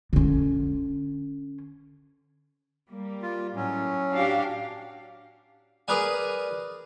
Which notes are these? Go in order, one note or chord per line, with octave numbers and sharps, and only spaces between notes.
D3 C#4
G3 A#3
F4
A2 F#3 C#4
D4 F#4 G4 F5
G#4 A#4 B4 D5 G#5